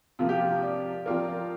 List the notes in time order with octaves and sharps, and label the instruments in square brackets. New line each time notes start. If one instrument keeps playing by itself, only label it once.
[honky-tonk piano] C3 F3 A#3 [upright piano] F4
[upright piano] G4
F4
D5
[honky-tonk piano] F3 C4 F4 A#4 [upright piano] D5
[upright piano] D5